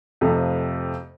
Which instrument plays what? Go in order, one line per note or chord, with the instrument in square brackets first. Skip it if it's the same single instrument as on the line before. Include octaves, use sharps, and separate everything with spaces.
[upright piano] F2 C3 F3 A3